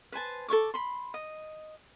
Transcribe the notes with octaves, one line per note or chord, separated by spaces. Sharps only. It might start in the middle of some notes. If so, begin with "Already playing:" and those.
B4 C5 G#5 A5
A4 C#5 C#6 D6
B5 C6
D#5